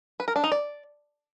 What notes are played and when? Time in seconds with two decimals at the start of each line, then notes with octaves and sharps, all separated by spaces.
0.20 B4
0.28 A#4
0.36 D4
0.44 D#4
0.52 D5